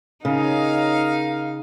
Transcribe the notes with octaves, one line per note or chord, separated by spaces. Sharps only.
C#3 D#4 A#4 D#5 F5